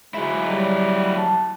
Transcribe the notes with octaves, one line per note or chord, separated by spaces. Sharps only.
F#3 G#3 E4
G3
A5